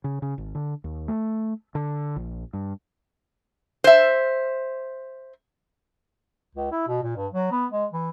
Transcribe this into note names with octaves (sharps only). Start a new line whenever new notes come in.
C#3
C#3
G#1
D3
D#2
A3
D3
A#1
G2
C5 E5
C#2
E4
B2
A#2
G2
F#3
B3
G#3
E3